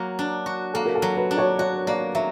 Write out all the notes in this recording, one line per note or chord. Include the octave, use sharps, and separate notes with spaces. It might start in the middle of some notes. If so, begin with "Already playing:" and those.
Already playing: F#3 A#3 F#4
D4
F#4
A#3 A4
A#4
A4
F#3
B4
D4
C#5
F#4 C#5
A#3 D5
F#3 E5